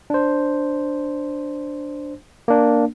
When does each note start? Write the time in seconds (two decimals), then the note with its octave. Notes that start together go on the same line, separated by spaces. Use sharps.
0.10 D4 C5
2.48 A#3 D4